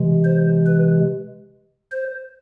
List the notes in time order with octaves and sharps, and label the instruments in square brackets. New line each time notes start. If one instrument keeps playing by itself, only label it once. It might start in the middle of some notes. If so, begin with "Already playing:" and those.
Already playing: [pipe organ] C3 E3 G#3
C5
B4
C5